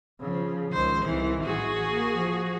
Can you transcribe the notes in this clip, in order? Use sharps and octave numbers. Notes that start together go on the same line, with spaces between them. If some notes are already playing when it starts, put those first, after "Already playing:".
C#3 F3
C#2 D#3 C5
C2 D#3 E3
A1 E3 F#4 G#4
A#3
F3